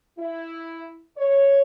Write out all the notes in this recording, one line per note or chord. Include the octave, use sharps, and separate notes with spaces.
E4
C#5